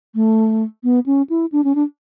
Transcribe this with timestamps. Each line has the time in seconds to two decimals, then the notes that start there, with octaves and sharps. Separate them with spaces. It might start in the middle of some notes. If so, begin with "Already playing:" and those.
0.15 A3
0.84 B3
1.06 C#4
1.30 E4
1.52 D4
1.64 C#4
1.75 D4